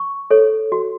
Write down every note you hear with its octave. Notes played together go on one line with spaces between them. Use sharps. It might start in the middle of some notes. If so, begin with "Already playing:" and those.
Already playing: C#6
A4 C#5
F#4